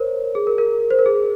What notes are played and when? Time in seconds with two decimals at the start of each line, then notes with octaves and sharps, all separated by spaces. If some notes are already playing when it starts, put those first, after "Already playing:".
Already playing: A#4 C5 C#5
0.35 G#4
0.47 A#4
0.58 A#4
0.91 C5
0.99 A#4
1.06 G#4